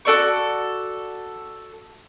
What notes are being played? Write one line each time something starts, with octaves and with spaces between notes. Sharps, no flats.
F#4 A4 D5 C#6